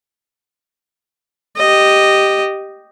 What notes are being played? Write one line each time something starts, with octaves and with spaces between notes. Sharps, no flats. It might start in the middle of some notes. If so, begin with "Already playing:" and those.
G4 D#5